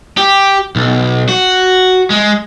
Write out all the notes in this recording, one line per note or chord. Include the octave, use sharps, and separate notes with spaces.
G4
B1
F#4
G#3